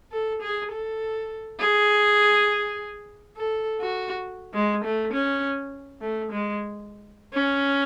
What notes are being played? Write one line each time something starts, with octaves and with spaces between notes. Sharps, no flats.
A4
G#4
A4
G#4
A4
F#4
G#3
A3
C#4
A3
G#3
C#4